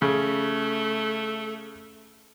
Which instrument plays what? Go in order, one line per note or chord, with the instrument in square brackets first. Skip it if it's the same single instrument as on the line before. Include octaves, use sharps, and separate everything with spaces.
[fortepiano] C#3 [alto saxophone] A3